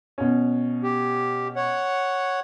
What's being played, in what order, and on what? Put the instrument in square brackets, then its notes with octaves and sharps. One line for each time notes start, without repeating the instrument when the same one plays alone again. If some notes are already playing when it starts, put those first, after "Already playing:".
[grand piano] B2 C#4
[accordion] G4
C#5 F#5